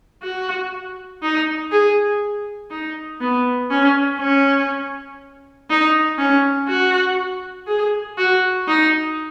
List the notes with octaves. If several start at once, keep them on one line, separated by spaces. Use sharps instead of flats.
F#4
D#4
G#4
D#4
B3
C#4
C#4
D#4
C#4
F#4
G#4
F#4
D#4